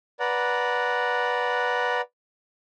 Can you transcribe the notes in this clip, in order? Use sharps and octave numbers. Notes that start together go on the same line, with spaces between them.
B4 D5 F#5 A#5